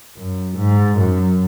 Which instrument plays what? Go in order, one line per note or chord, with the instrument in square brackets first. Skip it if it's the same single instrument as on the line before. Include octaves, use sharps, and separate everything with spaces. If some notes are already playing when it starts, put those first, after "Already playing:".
[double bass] F#2
G#2
F#2